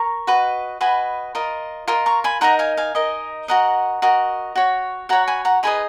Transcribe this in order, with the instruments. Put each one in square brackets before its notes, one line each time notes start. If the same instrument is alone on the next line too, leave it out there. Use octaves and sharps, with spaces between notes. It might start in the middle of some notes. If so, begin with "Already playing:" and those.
Already playing: [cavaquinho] A#4 A#5 C#6
F#4 B4 D#5
F#4 B4 D#5 G#5 B5
F4 A#4 D#5
F4 A#4 D#5
A#5 C#6
G#5 B5
D#4 A#4 D#5 F#5 A#5
F5 G#5
F5 G#5
D#4 A#4 D#5
F#4 A#4 D#5 F#5 A#5
F#4 A#4 D#5
F#4 C#5
F#4 C#5 F#5 A#5
G#5 B5
F#5 A#5
D#4 G#4 B4 D#5 G#5 B5